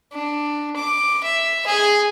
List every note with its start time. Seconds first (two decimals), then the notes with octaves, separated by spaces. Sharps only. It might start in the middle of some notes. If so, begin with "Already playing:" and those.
0.13 D4
0.76 D6
1.24 E5
1.67 G#4